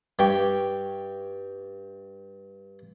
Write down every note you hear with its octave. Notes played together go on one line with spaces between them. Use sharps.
G2 G4 G5 C#6